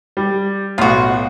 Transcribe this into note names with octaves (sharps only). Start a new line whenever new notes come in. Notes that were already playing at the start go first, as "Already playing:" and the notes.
G3
B1 A2 F4 F#4